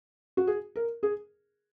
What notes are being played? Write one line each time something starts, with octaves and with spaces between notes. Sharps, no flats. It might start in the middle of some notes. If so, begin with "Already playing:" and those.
F#4
G#4
A#4
G#4